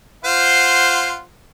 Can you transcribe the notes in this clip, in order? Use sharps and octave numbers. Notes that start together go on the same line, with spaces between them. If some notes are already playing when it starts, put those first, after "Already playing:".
F4 C5 F#5